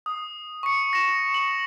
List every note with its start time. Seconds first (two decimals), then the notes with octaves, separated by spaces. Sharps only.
0.06 D#6
0.63 C#6 C#7
0.93 A#6 E7
1.34 F#7